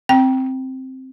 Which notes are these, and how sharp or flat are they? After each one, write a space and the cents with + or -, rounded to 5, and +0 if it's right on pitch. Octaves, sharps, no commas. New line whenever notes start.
C4 +5 G5 -10